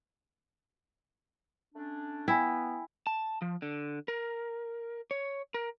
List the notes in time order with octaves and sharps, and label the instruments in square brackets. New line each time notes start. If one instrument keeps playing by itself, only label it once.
[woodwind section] A3 C#4 D4
[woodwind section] B3 [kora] E4 [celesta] G5 G#5
[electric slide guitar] A5
F3
D3
A#4
C#5
A#4